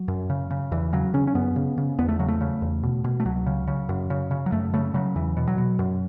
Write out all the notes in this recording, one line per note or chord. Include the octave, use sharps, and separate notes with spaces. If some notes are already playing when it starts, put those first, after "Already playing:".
Already playing: F#3
F#2
C#3
C#3
E2 E3
C#3 F#3
C#3 C#4
C#4
F#2 B3
C#3
C#3
E2 B3
A3
C#3 F#3
A3
C#3
E2
B2
B2
A3
C#2 F#3
C#3
C#3
F#2
C#3
C#3
F#3
F#2 A3
C#3 A3
C#3 F#3
E2 E3
B2
F#3
B2
F#2